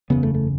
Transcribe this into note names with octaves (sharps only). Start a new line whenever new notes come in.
F#1 E2 C#3 B3
A3
A3